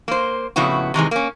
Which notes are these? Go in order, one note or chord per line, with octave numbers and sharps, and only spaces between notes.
A#3 C5
F2 A2 C#3 B3 E4 F#4
C3 D#3 E3 G#3
A#3 C#4